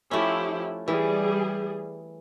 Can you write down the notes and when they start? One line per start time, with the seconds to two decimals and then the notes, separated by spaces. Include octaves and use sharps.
0.11 F3 A3 C#4 E4 G4
0.88 E3 G3 G#4